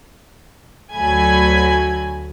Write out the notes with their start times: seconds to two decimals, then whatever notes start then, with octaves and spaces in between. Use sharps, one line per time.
0.94 D2 F#3 A3 G#5 B5 G#6